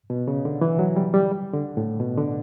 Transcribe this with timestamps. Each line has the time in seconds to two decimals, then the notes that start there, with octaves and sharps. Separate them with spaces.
0.10 B2
0.28 C#3
0.45 D3
0.61 E3
0.79 F#3
0.96 G3
1.14 G3
1.54 D3
1.77 A2
2.00 B2
2.17 D3